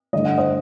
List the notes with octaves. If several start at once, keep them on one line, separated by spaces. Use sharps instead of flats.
G2 D3 A3 D4 D#5
F#5
C5 D#5